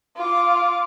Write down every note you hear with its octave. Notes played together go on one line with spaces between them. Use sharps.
F4 D6